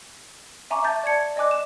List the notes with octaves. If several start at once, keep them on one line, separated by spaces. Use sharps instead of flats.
E5 G#5 A#5 C#6 D6
E5 A5 G6 A6
D5 A5 G#6 C#7
D5 D#5 G#5 D6 F#6
E7